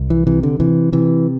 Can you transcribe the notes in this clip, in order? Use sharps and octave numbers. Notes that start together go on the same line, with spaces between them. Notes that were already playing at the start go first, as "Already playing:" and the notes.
Already playing: C2
E3
C3 E3
D3
C3 E3
C3 E3